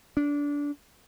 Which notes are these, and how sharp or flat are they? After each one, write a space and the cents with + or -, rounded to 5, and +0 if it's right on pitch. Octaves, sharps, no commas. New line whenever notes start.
D4 -20